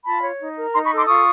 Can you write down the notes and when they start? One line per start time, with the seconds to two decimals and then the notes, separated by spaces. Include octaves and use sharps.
0.05 F4 A5 B5
0.23 C#5
0.40 D#4
0.57 A#4
0.74 D#4 A#5 C6
0.85 B5 C#6
0.90 A4
0.96 C6 D6
1.08 F4 C#6 D#6